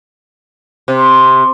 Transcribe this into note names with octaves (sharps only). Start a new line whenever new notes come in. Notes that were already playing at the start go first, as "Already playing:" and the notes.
C3